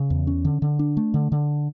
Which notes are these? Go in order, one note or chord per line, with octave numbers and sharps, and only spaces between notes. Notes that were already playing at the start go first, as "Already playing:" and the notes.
Already playing: C#3
E2
C#4
D3
D3
D4
A3
D3
D3